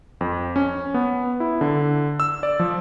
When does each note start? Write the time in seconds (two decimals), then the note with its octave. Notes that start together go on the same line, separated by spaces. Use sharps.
0.21 F2
0.56 C#4
0.94 B3
1.40 E4
1.61 D3
2.20 E6
2.43 D5
2.59 F3